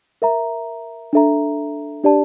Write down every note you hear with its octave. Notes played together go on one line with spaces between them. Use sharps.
A#4 E5 A#5
D4 A4 E5 A#5
D4 G4 D5 A5